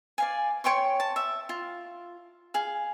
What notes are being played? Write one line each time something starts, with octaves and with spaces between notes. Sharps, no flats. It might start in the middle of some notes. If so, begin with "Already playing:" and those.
D5 F5 G#5
C#5 G5 C6 C#6
A5
E5
F4
G#4 F5